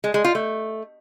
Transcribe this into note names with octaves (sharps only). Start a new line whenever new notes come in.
G#3
G#3
F4
A3